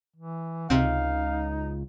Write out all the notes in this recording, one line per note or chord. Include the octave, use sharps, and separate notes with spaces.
E3
C#2 C3 C4 D#4 F5